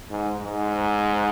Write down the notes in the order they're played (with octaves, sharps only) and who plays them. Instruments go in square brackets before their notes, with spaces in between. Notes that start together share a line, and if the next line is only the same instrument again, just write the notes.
[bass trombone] G#2
G#2